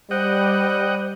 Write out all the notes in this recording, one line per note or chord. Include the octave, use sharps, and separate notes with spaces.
G3 C5 D#5 F#5 G5